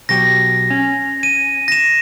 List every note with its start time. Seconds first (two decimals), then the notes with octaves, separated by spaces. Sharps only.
0.09 B2 F#3 G4 A#6
0.70 C#4
1.23 D#7
1.68 A#6 E7